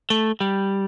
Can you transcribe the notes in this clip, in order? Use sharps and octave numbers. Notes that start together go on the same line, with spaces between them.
A3
G3